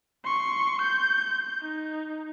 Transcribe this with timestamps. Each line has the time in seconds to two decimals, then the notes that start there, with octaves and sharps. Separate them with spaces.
0.25 C6 C#6
0.82 G6
1.62 D#4